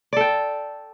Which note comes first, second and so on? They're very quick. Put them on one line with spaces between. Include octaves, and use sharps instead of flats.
D5 A4 G5